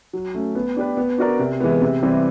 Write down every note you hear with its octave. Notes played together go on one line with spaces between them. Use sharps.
F#3
A3 C#4
B3
D4 G4 B4
B3
D4 F#4 A#4 D5
C3
E3 G#3 B3
C3
E3 G3 C4